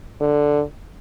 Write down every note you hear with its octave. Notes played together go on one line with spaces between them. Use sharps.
D3